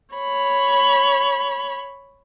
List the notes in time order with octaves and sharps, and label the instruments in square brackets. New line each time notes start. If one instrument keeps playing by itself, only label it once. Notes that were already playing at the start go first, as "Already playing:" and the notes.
[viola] C#5 B5